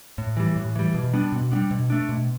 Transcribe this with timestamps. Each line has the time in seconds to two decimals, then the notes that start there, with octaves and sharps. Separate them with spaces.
0.18 A2
0.37 E3 G3
0.56 A2
0.76 E3 G3
0.94 B2
1.13 G3 B3 D4
1.32 B2
1.52 G3 B3 D4
1.71 B2
1.90 A3 D4
2.09 B2